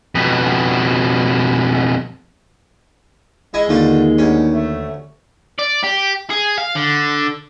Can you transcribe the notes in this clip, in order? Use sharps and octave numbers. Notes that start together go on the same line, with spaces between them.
F2 B2
G#3 E4 D#5 G#5
D#2 D3 A3 F4
D2 C#4
A3
D5
G4
G#4
F5
D3